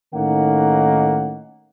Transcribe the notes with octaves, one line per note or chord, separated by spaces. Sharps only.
A2 D#3 A#3 C#4 D#4 F#5